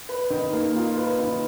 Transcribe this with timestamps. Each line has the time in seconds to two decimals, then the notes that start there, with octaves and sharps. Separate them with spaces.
0.09 B4
0.30 D#3
0.53 A#3
0.76 F4
0.97 B4
1.19 D#3